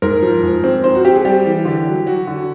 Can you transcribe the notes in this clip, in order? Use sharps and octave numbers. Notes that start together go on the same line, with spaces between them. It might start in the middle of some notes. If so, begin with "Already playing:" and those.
G#2 A#4
F3
G#2
C4
C4 C5
F#4
C4 G4
G#4
G3 G4
E3
D3
F#3
F#3 F#4
D3